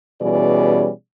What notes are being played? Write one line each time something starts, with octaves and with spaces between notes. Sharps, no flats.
B2 E3 G3 C#4 G#4 D5